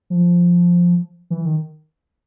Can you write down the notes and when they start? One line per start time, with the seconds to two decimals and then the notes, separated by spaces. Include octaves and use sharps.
0.10 F3
1.30 E3
1.45 D#3